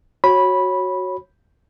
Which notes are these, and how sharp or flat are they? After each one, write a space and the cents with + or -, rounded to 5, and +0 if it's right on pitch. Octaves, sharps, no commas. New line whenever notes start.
F#4 +0 C#5 -15 B5 -10